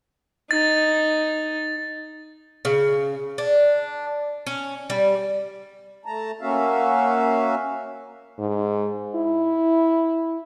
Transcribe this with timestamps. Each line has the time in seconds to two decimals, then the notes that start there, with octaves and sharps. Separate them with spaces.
0.51 D#4 A6
2.65 C#3
3.38 D4
4.47 C#4
4.90 G3
6.05 A3 A5 A#5
6.41 A#3 C#4 F#4 E5 F5
8.39 G#2
9.15 E4